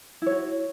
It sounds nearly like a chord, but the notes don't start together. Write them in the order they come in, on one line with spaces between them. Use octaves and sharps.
E4 C#5 F#4